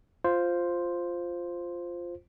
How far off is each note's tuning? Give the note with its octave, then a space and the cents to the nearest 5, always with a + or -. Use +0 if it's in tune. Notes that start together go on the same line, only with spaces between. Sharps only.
F4 +0 C5 +0